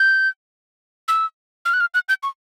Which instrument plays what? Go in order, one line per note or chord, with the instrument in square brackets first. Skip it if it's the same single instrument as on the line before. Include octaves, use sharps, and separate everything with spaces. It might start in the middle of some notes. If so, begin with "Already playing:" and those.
Already playing: [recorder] G6
E6
F6
F#6
F6
F#6
G6
C#6